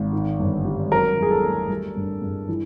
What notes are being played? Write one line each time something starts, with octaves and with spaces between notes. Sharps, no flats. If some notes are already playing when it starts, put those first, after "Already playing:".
Already playing: G#1
D#3
G1
G3
F#3 A#4
E2
G#4
A4
A3
G3
G2
G2
E3